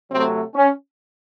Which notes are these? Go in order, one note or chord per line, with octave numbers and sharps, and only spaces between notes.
C3 F#3 A3 C4
C#4